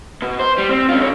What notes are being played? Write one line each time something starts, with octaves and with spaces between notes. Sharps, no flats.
B2
C5
G3
C4
C#4 F4
D3 C#5